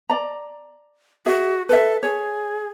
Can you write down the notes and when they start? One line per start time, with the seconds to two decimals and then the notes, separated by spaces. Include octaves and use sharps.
0.10 D5 A#5
1.26 F#4 G#4 E5
1.69 A4 B4 E5
2.03 G#4 C#5